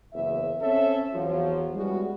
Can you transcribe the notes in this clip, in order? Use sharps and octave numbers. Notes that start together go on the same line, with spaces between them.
F#1 E2 E5
C4 C#4 A4 E5
E2 F3 F#3
G3 G#3 B3 C#4 E4 F#4